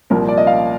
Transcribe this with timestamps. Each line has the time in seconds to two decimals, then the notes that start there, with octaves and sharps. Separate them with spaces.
0.10 C2 A#2 F3 A#4
0.28 D5
0.37 D#5
0.47 F5